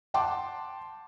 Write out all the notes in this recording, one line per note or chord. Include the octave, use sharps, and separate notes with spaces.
F#5 G5 A5 C6 D6